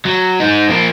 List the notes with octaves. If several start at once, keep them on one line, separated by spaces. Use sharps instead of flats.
F#3
G#3 D#4
F3 A#3